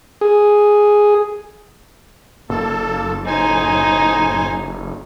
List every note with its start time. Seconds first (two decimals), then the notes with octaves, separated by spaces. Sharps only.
0.21 G#4
2.49 F#1 A#3 A4
3.27 A2 D#4 C5 G#5